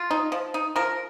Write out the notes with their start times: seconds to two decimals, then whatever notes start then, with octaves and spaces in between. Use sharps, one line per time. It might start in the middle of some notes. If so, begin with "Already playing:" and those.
Already playing: F4
0.11 D#4
0.32 F3
0.54 D#4
0.76 F3 A#4